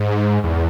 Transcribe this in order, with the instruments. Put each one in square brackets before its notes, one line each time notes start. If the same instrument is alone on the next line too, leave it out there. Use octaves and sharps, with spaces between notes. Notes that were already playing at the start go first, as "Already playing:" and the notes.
Already playing: [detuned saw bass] G#2
E2